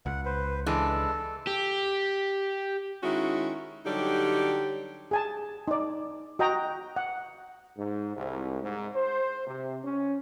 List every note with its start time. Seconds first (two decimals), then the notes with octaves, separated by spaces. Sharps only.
0.06 C#2 F#5
0.25 B4 C5
0.66 E3 G#3 D4 A4
1.47 G4
3.03 D#3 G#3 C#4 E4 F#4
3.86 D3 F#3 G3 D#4 G4
5.11 G#4 G#5 A5
5.68 D#4 D5
6.39 F#4 D#5 G5 A#5
6.96 F#5
7.77 G#2
8.16 C2
8.61 G#2
8.94 C5
9.46 C3
9.84 C#4